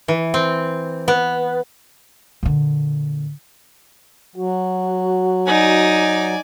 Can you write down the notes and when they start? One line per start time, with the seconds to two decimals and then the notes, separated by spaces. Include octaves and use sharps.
0.08 E3
0.34 C4
1.08 B3
2.43 A#2 D3
4.36 F#3 F#4
5.47 D#4 D5 G#5